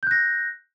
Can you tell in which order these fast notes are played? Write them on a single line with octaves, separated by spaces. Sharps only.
G6 F#6 A#6